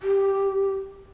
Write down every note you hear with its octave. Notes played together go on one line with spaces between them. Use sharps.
G4